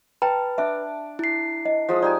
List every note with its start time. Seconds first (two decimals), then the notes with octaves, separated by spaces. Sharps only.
0.22 B4 G5 A5 A#5
0.58 D4 E5 D6
1.19 E4 C7
1.65 D#5
1.89 F3 G#3 E6
2.02 D#4 G4 D5 G#5